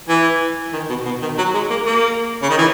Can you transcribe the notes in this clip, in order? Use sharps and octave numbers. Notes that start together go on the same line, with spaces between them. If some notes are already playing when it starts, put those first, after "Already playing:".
E3
D#3
B2
B2
D#3
F#3
G#3
A#3
A#3
C#3
D#3
E3